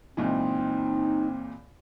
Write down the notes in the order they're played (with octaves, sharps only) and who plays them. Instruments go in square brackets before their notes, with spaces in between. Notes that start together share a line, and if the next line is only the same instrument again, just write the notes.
[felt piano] C#2 A#2 E3 [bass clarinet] C4 [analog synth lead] D#4